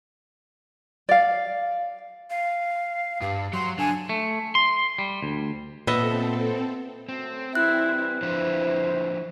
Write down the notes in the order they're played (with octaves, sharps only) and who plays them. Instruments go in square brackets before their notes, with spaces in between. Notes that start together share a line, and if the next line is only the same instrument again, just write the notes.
[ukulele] D5 F5
[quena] F5
[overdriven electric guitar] G2 [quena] F5
[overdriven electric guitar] F#3 [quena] C6
[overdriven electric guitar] D3 [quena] G#5
[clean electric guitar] A3
C6
G3
D2
[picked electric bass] A#2 [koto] B3 D#5 E5 [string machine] C4 A4
[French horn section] F#2 F#3 A3 [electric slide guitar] C4
[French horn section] E3 G3 [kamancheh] E4 [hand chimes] F#6
[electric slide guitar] F3 D4 B4 [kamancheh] E4 [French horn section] C5